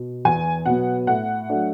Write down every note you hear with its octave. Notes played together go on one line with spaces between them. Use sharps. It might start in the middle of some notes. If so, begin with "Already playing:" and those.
Already playing: B2
E2 G#5
B2 F#3 B3 F#5
A2 F#5
F#3 A3 D4